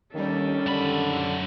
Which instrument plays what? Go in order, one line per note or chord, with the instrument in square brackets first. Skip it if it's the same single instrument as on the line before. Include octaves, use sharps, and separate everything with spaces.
[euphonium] D#2 [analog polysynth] D#3 G3 [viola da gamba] C#4 D4 A4
[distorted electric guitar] F#2 B5 [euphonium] D3